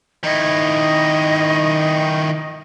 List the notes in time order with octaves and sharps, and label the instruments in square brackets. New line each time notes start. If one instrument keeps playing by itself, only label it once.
[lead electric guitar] D#3 E4 [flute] D#5